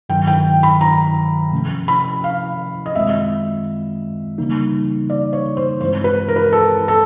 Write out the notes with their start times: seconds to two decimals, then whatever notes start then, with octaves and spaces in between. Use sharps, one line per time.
0.09 G2 D#3 F#3 G5
0.27 G5
0.63 B5
0.81 A#5
1.52 C3 F3 A3 C#4
1.88 B5
2.24 F5
2.86 D#5
2.95 F#2 D#3 G#3 C4 F4 E5
4.38 C#3 E3 G3 A#3 D#4
5.10 D5
5.33 C#5
5.57 C5
5.81 G2 E3 G#3 C4 E4 C5
6.04 B4
6.28 A#4
6.36 B4
6.44 A#4
6.53 A4
6.88 A4